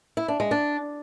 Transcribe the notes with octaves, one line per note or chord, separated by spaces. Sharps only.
E4
D4
G#3
D4